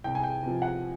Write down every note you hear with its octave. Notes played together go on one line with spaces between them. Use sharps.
C2 G5
G#5
G5
C3 F3
F#5